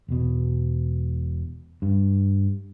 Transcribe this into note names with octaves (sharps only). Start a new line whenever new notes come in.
E1 B2
G2